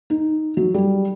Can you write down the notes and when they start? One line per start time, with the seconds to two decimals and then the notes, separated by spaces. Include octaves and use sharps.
0.10 D#4
0.57 F#3
0.74 G3